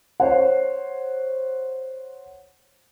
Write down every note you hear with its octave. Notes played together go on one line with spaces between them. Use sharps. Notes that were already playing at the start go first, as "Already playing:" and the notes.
C5 C#5 F#5